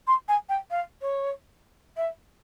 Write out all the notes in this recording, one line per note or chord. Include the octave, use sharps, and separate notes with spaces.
C6
G#5
G5
F5
C#5
E5